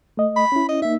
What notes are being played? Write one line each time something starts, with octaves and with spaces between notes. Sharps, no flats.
A3 D#5
B5
C#4 E4
D#5
A#3 D#4 E5